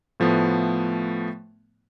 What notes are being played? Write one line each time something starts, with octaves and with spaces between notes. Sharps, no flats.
A2 F3 A3 B3